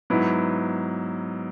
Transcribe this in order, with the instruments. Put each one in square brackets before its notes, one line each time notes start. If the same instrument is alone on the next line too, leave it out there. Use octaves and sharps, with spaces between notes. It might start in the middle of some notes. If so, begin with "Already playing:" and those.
[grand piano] G#2 F#3 B3 E4